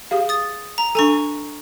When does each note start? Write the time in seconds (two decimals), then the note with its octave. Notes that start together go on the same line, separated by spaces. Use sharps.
0.11 G4 G#4 F5
0.29 D#6 A6
0.78 A#5
0.95 D4 A4 G#5 A#5 C#6